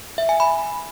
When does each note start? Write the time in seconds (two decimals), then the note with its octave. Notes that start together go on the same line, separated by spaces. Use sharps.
0.18 E5
0.29 G#5
0.40 B5